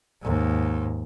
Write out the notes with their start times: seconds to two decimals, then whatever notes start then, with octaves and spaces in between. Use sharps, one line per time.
0.21 D#2 G#2